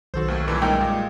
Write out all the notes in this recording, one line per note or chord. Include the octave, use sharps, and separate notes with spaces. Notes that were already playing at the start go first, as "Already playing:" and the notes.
B1 D#3 F#3 F#4 A4 C5
D#2 A3
G2 A#2 E3
F#2 G3 G#3 A#3 D#4 A#4 G5
A#2 G#3 D#5